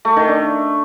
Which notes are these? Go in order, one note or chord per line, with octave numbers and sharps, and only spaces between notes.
A3
D#3
D4